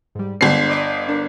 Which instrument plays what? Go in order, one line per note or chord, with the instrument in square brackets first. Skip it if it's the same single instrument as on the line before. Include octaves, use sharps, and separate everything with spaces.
[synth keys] G#2 G3
[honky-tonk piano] G1 C7 [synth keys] G#3 D4 C5
[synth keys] D5 D#5 D6
D4 A#4